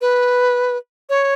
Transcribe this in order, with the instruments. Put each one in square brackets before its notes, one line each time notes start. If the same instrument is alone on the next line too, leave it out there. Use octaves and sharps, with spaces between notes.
[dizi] B4
C#5